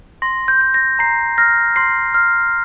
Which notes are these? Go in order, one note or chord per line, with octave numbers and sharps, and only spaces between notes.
C6 A#6
G6
G6
A#6
A#5 C7
F6 A#6
C6 C7
F6